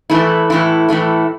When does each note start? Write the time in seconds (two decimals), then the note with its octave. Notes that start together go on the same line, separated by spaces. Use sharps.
0.10 A2 E3 A3 E4
0.50 A2 E3 A3 E4
0.89 A2 E3 A3 E4